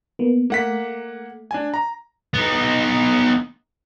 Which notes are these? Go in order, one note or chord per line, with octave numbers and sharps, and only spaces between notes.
A#3 B3
A3 A#3 F#5 B6
D4 G#5
A#5
B3 D#4